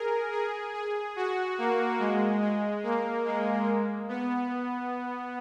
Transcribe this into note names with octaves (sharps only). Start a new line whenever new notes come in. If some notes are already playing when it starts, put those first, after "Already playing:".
Already playing: G#4 A#4
G#4
G#4
F#4
A#3
G#3
G#3
A#3
G#3
B3